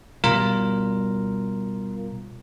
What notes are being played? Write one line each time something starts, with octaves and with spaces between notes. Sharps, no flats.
B2 G3 F4 A#4